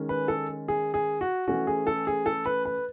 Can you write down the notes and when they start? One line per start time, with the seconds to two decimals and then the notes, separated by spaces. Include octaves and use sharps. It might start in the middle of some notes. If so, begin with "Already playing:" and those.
Already playing: D#3 G#3 C#4
0.09 B4
0.28 A4
0.68 G#4
0.94 G#4
1.21 F#4
1.48 E3 A3 C#4 F#4
1.67 G#4
1.87 A4
2.07 G#4
2.26 A4
2.46 B4
2.65 B4